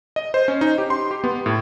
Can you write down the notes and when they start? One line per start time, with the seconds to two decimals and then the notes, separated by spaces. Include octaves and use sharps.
0.16 D#5
0.34 C5
0.48 C#4
0.61 D#4
0.78 G4
0.90 C6
1.11 G4
1.24 B3
1.46 A2